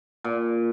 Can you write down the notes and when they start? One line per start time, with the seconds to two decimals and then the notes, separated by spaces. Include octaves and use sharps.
0.24 A#2